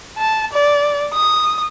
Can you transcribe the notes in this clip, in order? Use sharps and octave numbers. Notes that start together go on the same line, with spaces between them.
A5
D5
D#6